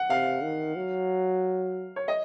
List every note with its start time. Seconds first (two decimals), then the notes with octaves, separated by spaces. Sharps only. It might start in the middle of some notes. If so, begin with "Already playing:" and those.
Already playing: F#5
0.10 C3 F5
0.42 D#3
0.76 F#3
1.96 C#5
2.08 D#5